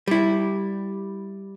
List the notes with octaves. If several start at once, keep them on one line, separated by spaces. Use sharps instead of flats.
G3 E4